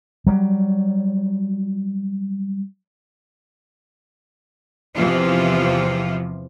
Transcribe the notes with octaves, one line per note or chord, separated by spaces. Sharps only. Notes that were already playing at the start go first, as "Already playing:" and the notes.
F#3 G3
E2 C3 E3 F3 F4